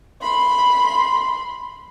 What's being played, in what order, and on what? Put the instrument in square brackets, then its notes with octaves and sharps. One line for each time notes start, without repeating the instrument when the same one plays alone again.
[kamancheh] B5 C6